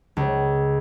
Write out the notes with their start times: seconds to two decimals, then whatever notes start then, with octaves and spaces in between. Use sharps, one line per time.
0.17 C#2